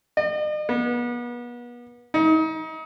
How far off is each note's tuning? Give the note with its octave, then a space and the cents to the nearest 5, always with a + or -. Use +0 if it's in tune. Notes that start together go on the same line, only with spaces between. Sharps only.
D#5 -45
B3 -35
D#4 +35